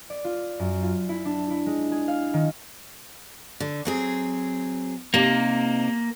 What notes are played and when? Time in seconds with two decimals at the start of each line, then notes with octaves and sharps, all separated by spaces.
0.10 D5
0.25 F4
0.59 F#2
0.82 F4
1.09 E4
1.25 D4
1.50 E4
1.66 G#3
1.92 G#4
2.08 F5
2.34 D#3
3.60 D3
3.85 F#3 C4 G#4
5.14 C3 A#3 D#4